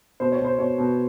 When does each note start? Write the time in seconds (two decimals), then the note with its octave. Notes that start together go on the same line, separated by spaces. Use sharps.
0.20 B2 C5
0.32 C#5
0.39 B2
0.45 C5
0.58 B2 C#5
0.78 B2